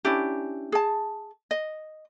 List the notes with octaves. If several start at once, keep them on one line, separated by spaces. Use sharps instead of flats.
C#4 D4 E4 G4
G#4 A5
D#5